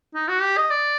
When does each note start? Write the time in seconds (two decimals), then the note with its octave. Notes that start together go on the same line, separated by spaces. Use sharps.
0.14 D#4
0.28 F#4
0.42 G4
0.57 D#5
0.71 D5